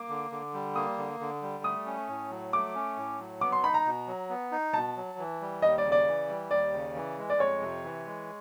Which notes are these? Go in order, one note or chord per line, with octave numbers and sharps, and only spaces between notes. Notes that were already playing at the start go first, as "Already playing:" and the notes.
Already playing: A#3 D6
D3
D3
G3
A#3 D#6
D3
D3
G3
A3 D#6
C#4
A2
F#3
A3 D6
C#4
A2
F#3
B3 D6
C6
D#4 B5
A#5
B2
F#3
B3
D#4
B2 A5
F#3
E3
G3
D#2 D#5
D5
C#3
D5
E3
G3
D#2 D5
C#3
E3
G#3
D5
F2 C#5
C3
E3
G#3